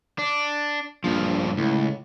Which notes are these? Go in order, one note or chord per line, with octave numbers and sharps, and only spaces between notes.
D4
A#1 G2 F3
C#2 A2